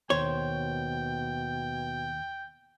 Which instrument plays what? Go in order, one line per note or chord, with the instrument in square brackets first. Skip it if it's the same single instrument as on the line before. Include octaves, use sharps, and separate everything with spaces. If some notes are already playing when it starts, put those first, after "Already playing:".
[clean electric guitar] D#2 C5 C6 [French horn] B2 [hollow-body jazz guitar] C#5 [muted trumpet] G5